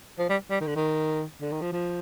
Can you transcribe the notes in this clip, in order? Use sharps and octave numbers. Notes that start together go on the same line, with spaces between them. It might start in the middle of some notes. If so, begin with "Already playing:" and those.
F3
G3
G3
D#3
D3
D#3
D3
D#3
F3
F3